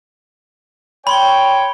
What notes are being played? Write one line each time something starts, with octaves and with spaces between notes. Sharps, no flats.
C#5 G5 B5 C6 G7